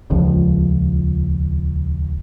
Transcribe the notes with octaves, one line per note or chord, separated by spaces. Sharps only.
D#1 C#2 F3